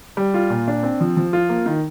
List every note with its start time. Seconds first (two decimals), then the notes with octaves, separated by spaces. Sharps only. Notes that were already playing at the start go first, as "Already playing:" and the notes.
0.17 G3
0.34 F4
0.50 A#2
0.68 D4
0.83 C4
1.01 F3
1.17 F3
1.33 F4
1.49 A#3
1.66 D#3